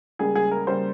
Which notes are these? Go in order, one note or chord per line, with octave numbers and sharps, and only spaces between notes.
C#2 C#3 G3 A#3 G#4
G#4
A#4
C#3 G3 A#3 C5